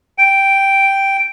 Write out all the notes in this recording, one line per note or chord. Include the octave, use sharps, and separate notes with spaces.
G5